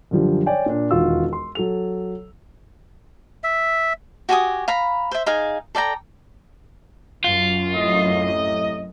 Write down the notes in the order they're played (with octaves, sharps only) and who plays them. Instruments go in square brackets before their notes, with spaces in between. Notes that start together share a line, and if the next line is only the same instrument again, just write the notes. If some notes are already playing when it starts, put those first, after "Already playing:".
[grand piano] F#2 D3 F3 G3
C#5 D5 G5 G#5
A#2 D4
E1 D#2 F4 F#4 E6
C6
F#3 A4 F7
[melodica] E5
[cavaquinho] F#4 G4 G#5 D#6
F5 A#5 B5
C5 E5
D#4 G#4 F5 G#5
A4 D5 G5 A#5
[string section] F#2 [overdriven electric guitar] F4
[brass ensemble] A2 C3 D#5